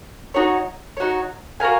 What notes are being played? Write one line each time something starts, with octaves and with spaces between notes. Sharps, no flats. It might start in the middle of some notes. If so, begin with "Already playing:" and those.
D#4 F#4 C#5
D#4 F#4 C#5
F#4 A#4 F5 G#5